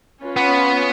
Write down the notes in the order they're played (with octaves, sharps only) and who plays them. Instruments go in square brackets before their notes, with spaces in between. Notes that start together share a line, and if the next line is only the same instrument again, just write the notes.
[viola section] C#4 F4 B4
[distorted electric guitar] B3